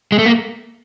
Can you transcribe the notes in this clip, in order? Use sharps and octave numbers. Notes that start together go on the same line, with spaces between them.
G#3
A3
A#3